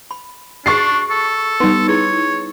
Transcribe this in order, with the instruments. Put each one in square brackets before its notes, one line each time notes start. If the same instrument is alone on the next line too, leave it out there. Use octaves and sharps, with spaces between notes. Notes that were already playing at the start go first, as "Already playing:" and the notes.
[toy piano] B5
[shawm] D4 [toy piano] F#4 G#4 [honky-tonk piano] C#6 A6 C7
[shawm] A4
[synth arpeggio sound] G3 B3 [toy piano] D#4 C6
[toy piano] E4 G#4 B4 [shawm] C#5